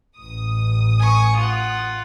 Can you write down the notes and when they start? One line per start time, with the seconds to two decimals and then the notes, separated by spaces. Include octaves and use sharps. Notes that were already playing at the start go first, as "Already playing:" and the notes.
0.16 A1 D#6
0.99 G#5 C#6
1.36 F4 F#5